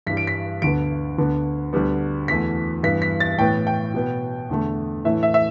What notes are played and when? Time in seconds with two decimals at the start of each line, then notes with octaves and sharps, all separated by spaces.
0.07 G2 E3 G3 B6
0.17 D7
0.27 B6
0.62 D2 D3 B3 D7
1.18 D2 D3 B3
1.73 D2 D3 G3 B3
2.28 E2 E3 A3 B6
2.83 G2 E3 B3 B6
3.02 B6
3.20 A6
3.38 A2 E3 B3 G5
3.67 G5
3.94 B2 B3
4.49 E2 D3 A3
5.04 A2 E3 A3 E5
5.23 E5
5.34 E5